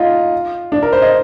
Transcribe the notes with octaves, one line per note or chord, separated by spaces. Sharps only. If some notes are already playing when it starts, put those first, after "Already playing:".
Already playing: D#4 F4
D4
A#4
C5
D#5